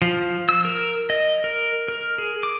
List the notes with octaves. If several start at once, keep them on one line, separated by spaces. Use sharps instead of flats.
F3
E6
A#4
D#5
A#4
A#4
G#4
D6